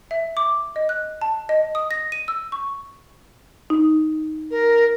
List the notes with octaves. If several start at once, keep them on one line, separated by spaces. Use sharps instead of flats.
E5
D6
D#5
F#6
A5
D#5
D#6
A#6
D#7
E6
C#6
D#4
A#4